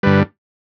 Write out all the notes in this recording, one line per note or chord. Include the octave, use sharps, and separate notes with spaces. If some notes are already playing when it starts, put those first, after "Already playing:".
G2 D3 G3 B4